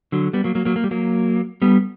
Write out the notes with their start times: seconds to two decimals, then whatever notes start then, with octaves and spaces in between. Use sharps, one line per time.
0.12 D3 F#3
0.33 G3 B3
0.44 F#3 A#3
0.55 F#3 A#3
0.65 F#3 A#3
0.76 A#3
0.84 G3
0.91 F#3 A#3
1.62 G3 B3